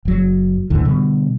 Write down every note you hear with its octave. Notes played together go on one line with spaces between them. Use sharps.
F#1 F#3
D2 G#2 D3 E3
B2 D3 G3